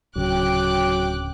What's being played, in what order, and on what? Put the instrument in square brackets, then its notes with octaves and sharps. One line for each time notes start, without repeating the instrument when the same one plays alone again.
[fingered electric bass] D1 C#3 [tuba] F#3 [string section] G5 D6 F#6